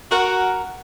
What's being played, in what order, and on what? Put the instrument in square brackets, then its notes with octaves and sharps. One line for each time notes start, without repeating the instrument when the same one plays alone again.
[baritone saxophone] F#4 [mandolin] A#4 F#5